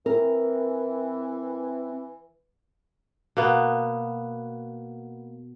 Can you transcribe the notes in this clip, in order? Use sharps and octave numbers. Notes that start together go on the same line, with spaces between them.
E3 C4 A#4
B2 A#3 B3